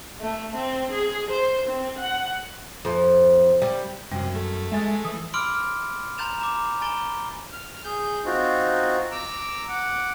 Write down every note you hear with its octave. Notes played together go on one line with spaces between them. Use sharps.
A3
C4
G#4
C5
C4
F#5
F2
G3
F#2 C3 G3
A3
G#3 E5 G#5 A6
E3 D#6
B5 C6 D6 E6 F6 D7
F6
A#5 C6 G6 A6 E7 F7
A#5 D6
G#5 A#5 B5 A6 D7 G7
F6
G#4 G6
C4 D#4 F4 F#4
A#5 D6 E6
F#5 D6